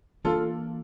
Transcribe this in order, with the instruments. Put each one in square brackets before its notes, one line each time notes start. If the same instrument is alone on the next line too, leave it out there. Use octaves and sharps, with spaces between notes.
[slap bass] E3 A#3 D4 [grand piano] F4 A4